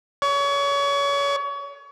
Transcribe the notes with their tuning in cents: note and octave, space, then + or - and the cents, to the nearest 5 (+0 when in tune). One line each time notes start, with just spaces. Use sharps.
C#5 +30